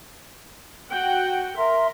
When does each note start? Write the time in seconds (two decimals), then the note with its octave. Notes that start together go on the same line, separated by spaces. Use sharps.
0.91 F#4 F#5 G5
1.57 A#4 E5 C6